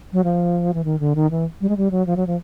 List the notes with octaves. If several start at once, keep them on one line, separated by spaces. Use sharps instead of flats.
F#3
F3
E3
D#3
D3
D#3
E3
G3
G#3
G3
F#3
F3
F#3
F3